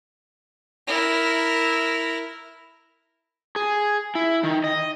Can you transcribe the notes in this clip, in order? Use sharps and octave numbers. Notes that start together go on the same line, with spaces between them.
E4 A#4
G#4
E4
D#3
D#5